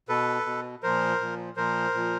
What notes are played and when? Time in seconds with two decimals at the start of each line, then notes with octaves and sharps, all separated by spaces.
0.09 B2 A4 B4
0.46 B2
0.83 A#2 F3 A#4 C5
1.21 A#2 F3
1.57 A#2 F3 A#4 C5
1.94 A#2 F3